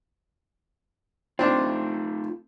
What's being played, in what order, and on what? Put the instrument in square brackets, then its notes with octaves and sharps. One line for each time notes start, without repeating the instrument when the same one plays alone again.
[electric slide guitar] A3 D#4 F4 [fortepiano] C4 D4